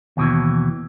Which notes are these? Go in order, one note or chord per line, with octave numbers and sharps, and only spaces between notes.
D#2 B2 E3